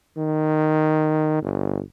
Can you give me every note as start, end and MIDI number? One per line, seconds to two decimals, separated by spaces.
0.17 1.42 51
1.42 1.80 31